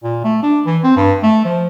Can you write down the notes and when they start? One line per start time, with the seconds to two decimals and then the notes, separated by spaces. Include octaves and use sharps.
0.04 A#2
0.24 A3
0.43 D4
0.66 E3
0.84 C4
0.96 G2
1.23 A3
1.45 F3